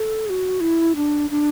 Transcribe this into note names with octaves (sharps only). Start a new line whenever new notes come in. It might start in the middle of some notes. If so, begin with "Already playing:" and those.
Already playing: A4
G#4
F#4
E4
D4
D4